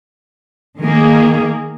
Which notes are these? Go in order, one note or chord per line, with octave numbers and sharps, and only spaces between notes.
D#3 A#3 G#4